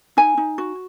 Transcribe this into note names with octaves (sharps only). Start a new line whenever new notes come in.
D#4 G#5
D#4
F#4